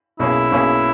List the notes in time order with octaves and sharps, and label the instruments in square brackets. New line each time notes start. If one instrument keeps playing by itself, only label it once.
[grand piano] B1 B2 A#3 C#4 G#4 [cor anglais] E4
[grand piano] B1 B2 A#3 C#4 G#4